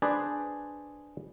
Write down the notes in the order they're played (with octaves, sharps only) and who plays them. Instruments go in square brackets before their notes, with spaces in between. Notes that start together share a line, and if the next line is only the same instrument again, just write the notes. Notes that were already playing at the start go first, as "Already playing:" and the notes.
[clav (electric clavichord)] D4 G#4 B4 C5 D5